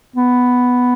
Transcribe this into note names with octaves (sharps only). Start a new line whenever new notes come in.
B3